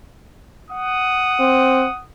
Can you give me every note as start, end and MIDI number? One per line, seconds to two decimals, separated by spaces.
0.71 2.01 78
0.71 2.01 87
1.40 1.85 60